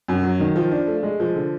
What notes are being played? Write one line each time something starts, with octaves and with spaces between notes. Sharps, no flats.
F#2
F#3
D#3
F3
D4
A3
G#3
F3
D3